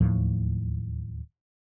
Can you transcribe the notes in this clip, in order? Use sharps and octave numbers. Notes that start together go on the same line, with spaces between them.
D1 D#2 A2 F3